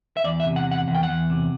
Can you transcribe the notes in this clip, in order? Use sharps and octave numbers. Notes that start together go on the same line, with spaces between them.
E5
E2 D5
E5
C3
F#5
E2 F#5
E2 F#5
G5
F#5
E2
C3